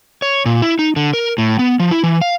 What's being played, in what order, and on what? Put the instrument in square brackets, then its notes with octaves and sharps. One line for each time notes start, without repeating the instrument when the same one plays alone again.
[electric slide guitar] C#5
A#2
E4
D#4
D3
A#4
A2
B3
F3
E4
E3
F5